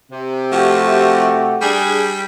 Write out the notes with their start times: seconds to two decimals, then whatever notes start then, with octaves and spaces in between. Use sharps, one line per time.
0.11 C3
0.52 F3 A3 F#4 G4
1.61 G3 D4 G4 G#4